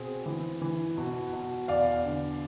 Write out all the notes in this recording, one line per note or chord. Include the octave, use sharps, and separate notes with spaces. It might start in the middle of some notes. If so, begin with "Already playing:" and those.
Already playing: B2 C4 G#4
E3
E3
B2
B2
E2 D5 F5
D3